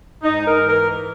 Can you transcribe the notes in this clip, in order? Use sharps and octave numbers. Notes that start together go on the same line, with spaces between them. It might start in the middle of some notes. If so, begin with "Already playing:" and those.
G#2 D#4
A#4
E3
A#4